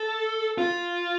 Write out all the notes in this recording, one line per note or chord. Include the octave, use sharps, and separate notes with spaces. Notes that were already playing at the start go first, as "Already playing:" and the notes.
Already playing: A4
F4